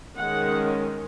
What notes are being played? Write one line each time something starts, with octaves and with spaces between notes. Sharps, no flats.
D#3 G#3 C#4 F#5